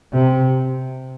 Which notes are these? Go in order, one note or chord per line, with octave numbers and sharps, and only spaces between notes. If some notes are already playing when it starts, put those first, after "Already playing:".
C3